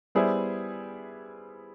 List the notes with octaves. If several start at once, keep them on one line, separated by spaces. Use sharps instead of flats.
G3 B3 E4 G#4 C5